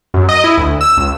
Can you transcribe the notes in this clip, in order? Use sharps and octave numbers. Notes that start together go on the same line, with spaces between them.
F#2
D#5
E4
D2
E6
C#2